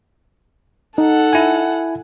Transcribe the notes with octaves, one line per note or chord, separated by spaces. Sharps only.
D#4 A4 F#5
E4 G#5